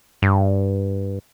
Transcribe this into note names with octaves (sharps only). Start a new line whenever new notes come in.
G2